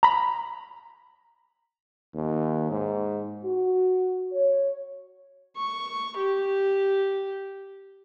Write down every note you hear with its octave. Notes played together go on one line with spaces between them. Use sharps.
A#5 B5
D#2
G#2
F#4
C#5
C#6
G4